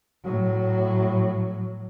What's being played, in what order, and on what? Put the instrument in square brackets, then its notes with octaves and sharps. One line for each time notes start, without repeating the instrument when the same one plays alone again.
[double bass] A2 F#3